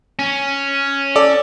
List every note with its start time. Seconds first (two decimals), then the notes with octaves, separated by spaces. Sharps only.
0.19 C#4
1.16 A4 D5